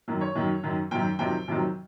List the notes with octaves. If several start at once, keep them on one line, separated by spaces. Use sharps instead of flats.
F#2 D#3 F#3
C#5
F#2 D#3 F#3
F#2 D#3 F#3
F#2 D#3 F#3 G5
F2 C3 D#3 F#3 G5
F2 C3 D#3 F#3